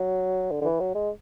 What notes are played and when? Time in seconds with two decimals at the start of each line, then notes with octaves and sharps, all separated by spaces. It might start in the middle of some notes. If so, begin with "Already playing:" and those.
Already playing: F#3
0.51 D3
0.61 D3
0.65 E3
0.80 F#3
0.95 G#3